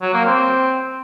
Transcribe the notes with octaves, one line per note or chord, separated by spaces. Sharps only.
F#3
A#3
C4